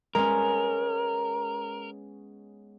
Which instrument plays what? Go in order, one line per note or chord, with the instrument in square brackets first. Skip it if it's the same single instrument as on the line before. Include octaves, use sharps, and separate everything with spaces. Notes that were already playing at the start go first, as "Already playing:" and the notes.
[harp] G#3 B3 C#4 [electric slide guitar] A#4